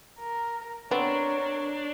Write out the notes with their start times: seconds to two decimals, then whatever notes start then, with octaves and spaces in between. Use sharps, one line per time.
0.19 A#4
0.91 B3 C4 D4 A#4 C#5